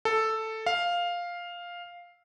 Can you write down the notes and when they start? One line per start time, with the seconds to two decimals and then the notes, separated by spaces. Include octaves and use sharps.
0.05 A4
0.66 F5